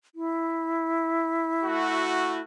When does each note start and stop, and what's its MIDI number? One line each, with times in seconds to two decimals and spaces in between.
0.15 2.41 64
1.63 2.42 57
1.63 2.42 66